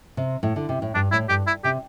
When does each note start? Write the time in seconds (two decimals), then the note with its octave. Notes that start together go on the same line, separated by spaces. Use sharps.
0.17 C3
0.43 A2
0.56 D3
0.69 C3
0.82 A2
0.95 G2 D4
1.12 A2 E4
1.29 G2 G4
1.47 E4
1.64 C3 G4